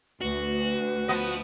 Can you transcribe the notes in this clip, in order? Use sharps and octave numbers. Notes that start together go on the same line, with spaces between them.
D2 F#4 B4
F3 B3 D#5